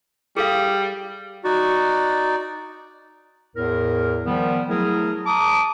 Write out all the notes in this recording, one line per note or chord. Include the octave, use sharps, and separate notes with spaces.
G3 G#4 A4 F5
D#4 F#4 D5
E2 A2 A#4
D#3 F3 G3 B3
F#3 A3 E4 G#4 A#4
A5 A#5 D6 D#6